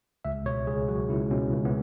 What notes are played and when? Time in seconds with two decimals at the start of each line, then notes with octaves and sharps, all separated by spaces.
0.25 C#2 E5
0.46 B2 C#5
0.67 C#2 G#4
0.88 F#3 F#4
1.09 C#2 E4
1.31 B2 C#4
1.52 C#2
1.65 B3